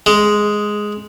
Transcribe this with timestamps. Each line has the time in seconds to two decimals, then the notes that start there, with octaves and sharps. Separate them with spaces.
0.06 G#3